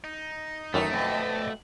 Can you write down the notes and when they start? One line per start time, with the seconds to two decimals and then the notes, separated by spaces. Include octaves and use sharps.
0.04 D#4
0.74 F#2 D#3 E3 A3 D#4 C#5
0.90 F2 B2 D5 D#5